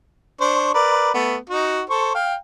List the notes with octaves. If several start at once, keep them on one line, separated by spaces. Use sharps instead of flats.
D4 C5 C#6
A#4 B4 D5
A3 B3
D#4 F#4
A4 C5 C#6
F5 G5